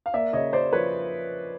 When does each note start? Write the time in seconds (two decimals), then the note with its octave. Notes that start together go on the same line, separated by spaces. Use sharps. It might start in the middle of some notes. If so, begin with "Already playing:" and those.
0.06 F5
0.14 A#3 D5 E5
0.33 C#3 C#5 D#5
0.53 C#3 C5 D5
0.73 F3 B4 C#5